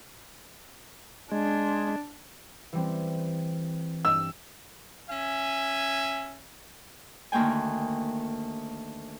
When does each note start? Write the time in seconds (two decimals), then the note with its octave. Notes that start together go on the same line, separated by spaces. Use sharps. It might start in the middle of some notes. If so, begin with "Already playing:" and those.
1.32 G#3 D4
2.73 E3 G3 C4
4.05 G2 E6
5.10 C#4 E5 G#5
7.32 D2 D#3 A#3 G5 G#5